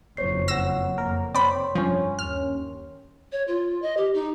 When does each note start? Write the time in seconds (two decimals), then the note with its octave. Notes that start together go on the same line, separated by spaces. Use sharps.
0.17 F#1 F2 C5 C#5 C7
0.48 C#5 F#5 E6 A#6
0.98 F2 A#3 A#4
1.35 F1 C4 C#5 D5 G5 B5 C6
1.75 G2 F3 C#4
2.19 D#2 F6
3.32 C#5
3.47 F4
3.82 D#5
3.97 G4
4.14 D#4